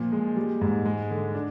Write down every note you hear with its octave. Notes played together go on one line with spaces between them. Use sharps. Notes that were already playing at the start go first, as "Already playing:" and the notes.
Already playing: A#2 F3
G#3
G3
G#2
G#3
D3
D4